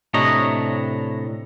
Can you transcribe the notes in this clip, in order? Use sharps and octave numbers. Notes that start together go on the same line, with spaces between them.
A2 C3 D4 C#5 D#5 A#5